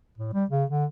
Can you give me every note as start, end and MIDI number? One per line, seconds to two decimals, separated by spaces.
0.18 0.32 45
0.33 0.45 55
0.50 0.65 49
0.70 0.86 50